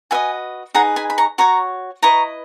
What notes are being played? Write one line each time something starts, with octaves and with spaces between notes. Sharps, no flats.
F#4 B4 D#5 E5 G#5
D#4 G#4 B4 F#5 A#5
G#5 B5
B5
A#5 C#6
F#4 C#5 A#5 C#6
E4 B4 D#5 A#5 C#6